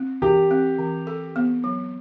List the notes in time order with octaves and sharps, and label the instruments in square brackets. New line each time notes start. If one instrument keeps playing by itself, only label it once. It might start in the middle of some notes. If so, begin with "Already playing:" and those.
Already playing: [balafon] C4
[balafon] E3 [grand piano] G4
[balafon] C4
E3
A4
B3
F#3